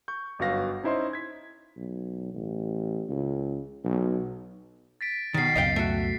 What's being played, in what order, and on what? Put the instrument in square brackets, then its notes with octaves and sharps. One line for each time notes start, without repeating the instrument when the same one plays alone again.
[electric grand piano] C#6 G6
G1 F#2 F#4 B4 F5 A#6
C#4 D#4 E4 C5 D#5 C6
G#6 B6
[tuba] B1
A1
C#2
B1
[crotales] A6 B6 D7
[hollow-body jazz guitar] B2 D#3 [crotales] A6 C7
[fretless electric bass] C#2 F#2 B2 [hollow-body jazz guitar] D#5 F5 G5
[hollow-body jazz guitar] A3 F#4